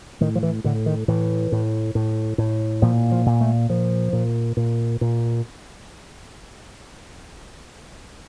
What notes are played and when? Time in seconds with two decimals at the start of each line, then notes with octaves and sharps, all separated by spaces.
0.21 A2 D#3
0.35 F3
0.43 E3
0.64 A2 D3
0.86 D#3
1.08 A2 E3
1.52 A2
1.95 A2
2.38 A2
2.82 A#2 F3
3.12 F3
3.26 A#2
3.41 A3
3.69 A#2 F3
4.13 A#2
4.57 A#2
5.01 A#2